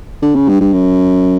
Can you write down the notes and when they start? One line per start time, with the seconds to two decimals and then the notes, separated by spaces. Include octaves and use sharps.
0.22 D3
0.35 C#3
0.49 G2
0.61 G2
0.73 F#2